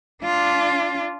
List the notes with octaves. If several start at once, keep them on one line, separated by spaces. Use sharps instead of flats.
D4 F4